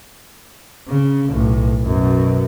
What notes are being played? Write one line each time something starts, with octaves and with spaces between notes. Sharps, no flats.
C#3
B1 A2
F#2 B2